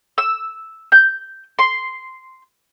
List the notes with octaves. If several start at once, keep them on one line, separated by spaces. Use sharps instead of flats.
E6
G6
C6